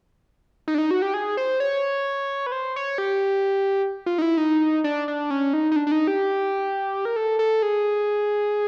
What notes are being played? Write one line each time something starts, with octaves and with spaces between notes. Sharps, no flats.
D#4
D4
D#4
F#4
G4
G#4
C5
C#5
B4
C5
C#5
G4
F4
D#4
E4
D#4
D4
D4
C#4
D#4
D#4
D4
D4
D#4
G4
A#4
A4
A4
G#4